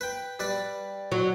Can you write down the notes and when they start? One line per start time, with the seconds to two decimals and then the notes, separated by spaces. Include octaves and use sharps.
0.01 B4 G5
0.40 G3 B4 D5
1.12 F#3